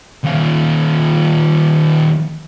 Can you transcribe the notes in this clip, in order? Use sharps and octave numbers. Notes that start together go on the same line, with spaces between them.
D#2 F4